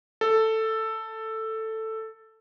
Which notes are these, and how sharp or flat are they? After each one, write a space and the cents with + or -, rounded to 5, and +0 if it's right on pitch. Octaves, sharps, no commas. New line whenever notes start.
A4 +10